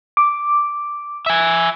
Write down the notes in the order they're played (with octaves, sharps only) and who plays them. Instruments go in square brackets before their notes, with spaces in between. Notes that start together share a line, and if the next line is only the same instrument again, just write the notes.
[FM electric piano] D6
[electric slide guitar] E5 G#5